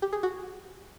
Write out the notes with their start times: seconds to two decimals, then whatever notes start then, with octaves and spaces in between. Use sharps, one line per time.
0.02 G4
0.13 G#4
0.23 F#4